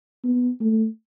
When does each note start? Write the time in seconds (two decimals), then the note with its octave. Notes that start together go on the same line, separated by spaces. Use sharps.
0.25 B3
0.60 A3